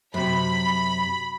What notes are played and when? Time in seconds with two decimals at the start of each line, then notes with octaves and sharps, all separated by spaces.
0.14 F#2 C3 B5